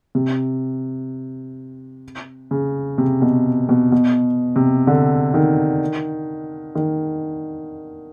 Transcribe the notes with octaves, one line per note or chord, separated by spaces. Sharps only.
C3
C#3
C3
B2
B2
B2
C3
D3
D#3
D#3